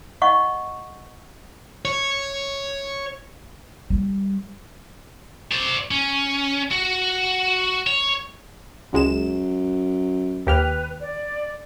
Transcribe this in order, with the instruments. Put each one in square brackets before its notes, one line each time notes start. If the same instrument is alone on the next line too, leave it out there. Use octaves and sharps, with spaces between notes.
[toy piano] D#5 F#5 C#6
[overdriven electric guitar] C#5
[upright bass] G3
[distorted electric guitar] C5 D5
C#4
F#4
C#5
[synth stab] C#2 G#3 E7 [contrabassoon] F#2
[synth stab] D#2 G4 F6 [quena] B4
[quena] D5